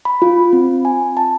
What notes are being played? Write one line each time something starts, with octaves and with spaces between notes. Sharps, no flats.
B5
F4
C4
G#5
A5